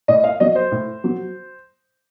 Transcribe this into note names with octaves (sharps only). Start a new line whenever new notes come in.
A2 D#5
F5
F#3 D#5
C5
A2
F#3